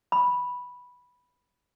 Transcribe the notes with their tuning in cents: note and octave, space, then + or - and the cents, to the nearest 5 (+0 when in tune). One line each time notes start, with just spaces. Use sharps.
B5 -5